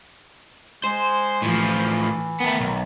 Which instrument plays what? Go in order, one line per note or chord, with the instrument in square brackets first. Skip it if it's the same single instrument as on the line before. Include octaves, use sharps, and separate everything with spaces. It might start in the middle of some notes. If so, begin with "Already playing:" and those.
[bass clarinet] G#3 [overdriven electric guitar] C5
[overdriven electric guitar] A2 F3 [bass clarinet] E3
[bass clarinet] D#3 [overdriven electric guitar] A3 B3
[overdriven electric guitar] B1